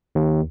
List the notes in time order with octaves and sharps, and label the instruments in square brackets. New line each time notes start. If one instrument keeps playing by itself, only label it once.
[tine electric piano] D#2